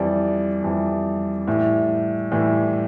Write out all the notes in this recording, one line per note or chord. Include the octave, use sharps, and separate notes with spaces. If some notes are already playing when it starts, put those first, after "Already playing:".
Already playing: F2 E3 G3 D5
F2 E3 G3
A2 E3 G3
A2 E3 G3